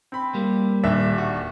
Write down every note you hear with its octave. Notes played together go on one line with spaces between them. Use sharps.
C4 B5
G3 A#3
D#1 D4 E5
F#4